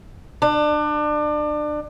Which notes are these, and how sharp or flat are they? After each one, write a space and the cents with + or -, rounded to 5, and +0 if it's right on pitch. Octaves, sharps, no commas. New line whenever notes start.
D4 +30